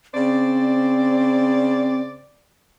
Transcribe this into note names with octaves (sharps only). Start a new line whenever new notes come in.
C#3 C4 C5 D5